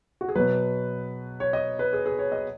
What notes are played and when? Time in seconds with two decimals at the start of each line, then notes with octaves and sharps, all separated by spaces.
0.21 F#4
0.29 G#4
0.35 B2 F#3 B4
1.40 C#5
1.53 D#5
1.79 B4
1.93 G#4
2.06 G#4
2.19 C#5
2.32 D#5